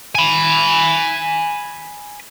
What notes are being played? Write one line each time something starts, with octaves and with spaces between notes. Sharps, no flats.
G#5 B5